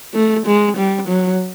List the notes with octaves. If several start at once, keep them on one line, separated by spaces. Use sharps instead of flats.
A3
G#3
G3
F#3